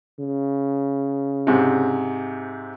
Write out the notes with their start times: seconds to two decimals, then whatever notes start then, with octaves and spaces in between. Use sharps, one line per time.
0.20 C#3
1.47 G#2 C3